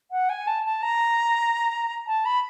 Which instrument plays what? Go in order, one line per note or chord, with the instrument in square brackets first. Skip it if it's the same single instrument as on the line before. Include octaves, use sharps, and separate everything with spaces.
[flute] F#5
G#5
A5
A5
A#5
A5
B5